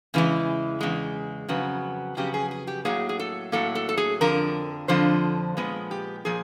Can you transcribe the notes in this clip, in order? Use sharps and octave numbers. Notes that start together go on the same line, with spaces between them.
E2 C#3 E3 G#3
E2 C#3 G#3
F2 C#3 F#3 B3
F2 C#3 F#3 B3 G4
G#4
G#4
G4
A2 F#3 A#3 G#4
G#4
A4
A2 F#3 A#3 A4
A4
A4
G#4
F2 D3 F3 A#4
F2 D3 F3 C5
A#2 F3 G#3 B3
G4
A#2 F3 G#4